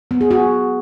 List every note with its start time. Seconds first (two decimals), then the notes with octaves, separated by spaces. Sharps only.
0.11 B3
0.21 G#4
0.31 F#4